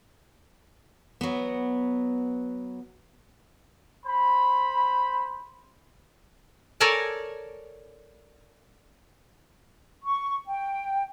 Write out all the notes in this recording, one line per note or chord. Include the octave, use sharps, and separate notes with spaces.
F#3 B3
C5 B5
A4 A#4 C#5 D5 G#5 A5
C#6
G5